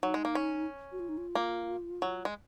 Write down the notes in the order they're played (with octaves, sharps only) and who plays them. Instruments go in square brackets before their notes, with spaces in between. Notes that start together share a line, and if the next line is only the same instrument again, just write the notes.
[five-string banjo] F#3 [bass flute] D#4
[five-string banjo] G#3
A#3
C#4
[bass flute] F#4
F4
D#4
F4
[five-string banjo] A#3
F#3
G#3